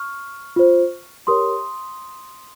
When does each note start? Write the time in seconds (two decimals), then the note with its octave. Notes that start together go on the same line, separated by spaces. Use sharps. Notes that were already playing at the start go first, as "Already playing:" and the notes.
Already playing: C#6 F6
0.56 F4 C5
1.27 G4 A#4 C#5 C6 D#6